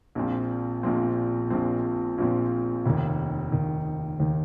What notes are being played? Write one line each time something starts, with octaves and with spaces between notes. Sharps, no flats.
A#1 A#2 F3 C4
A#1 A#2 F3 C4
A#1 A#2 F3 C4
A#1 A#2 F3 C4
F1 D#2 D#3
F1 D#2 D#3
D#2 D#3